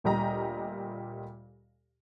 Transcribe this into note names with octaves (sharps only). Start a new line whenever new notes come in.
D2 A#2 G3 G4 D#5 A#5